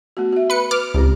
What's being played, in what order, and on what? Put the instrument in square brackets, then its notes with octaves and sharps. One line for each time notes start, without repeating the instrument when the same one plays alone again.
[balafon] A3 B3 F#4
F#4 E5
[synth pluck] B4 C#7
[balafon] B4 [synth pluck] D6 F6
[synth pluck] C#2 [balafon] C4 G4